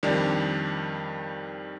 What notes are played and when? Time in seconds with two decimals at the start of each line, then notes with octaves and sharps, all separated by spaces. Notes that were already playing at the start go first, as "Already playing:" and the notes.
0.03 F2 D#3 G3 D4